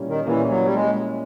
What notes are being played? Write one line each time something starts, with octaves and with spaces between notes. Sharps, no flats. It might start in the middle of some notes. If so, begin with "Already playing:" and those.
Already playing: A#2 G3 A#3 C#4 E4
D#3
A#2 E3 G3 A#3 C#4 E4
F#3
G3
G#3